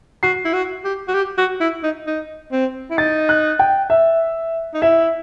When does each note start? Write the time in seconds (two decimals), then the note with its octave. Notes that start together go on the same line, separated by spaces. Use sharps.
0.23 F#4 C7
0.45 E4
0.53 F#4
0.84 G4
1.08 F#4
1.14 G4
1.38 F#4
1.61 E4
1.83 D#4
2.07 D#4
2.52 C4
2.90 E4
2.98 D#4 A6
3.29 F#6
3.59 G5
3.90 E5
4.74 D#4
4.82 E4 E5